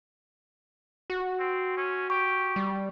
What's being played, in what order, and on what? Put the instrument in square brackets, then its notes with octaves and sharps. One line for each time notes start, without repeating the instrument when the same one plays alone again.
[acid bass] F#4
[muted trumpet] C4
C#4
[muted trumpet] G4 [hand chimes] C#6
[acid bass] G3